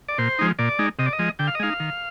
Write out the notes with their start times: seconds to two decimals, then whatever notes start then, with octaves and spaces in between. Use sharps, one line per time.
0.09 D5
0.18 A#2 C5
0.39 F3 G#3 D#4
0.59 A#2 D5
0.79 G#3 D#4
0.99 C3 D#5
1.06 D5
1.13 D#5
1.19 F3 G#3
1.39 D3 G5
1.47 F5
1.55 D#5
1.60 G#3 D#4 F5
1.80 D#3